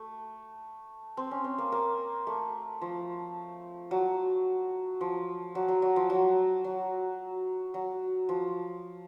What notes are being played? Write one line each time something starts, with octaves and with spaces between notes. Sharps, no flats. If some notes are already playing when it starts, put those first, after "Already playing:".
Already playing: A3
C4
C#4
C4
A#3
A#3
A3
F3
F#3
F3
F#3
F#3
F#3
F3
F#3
F#3
F#3
F3